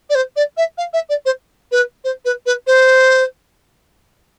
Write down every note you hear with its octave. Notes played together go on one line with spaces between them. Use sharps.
D5
C5
D5
E5
F5
E5
D5
C5
B4
C5
B4
B4
C5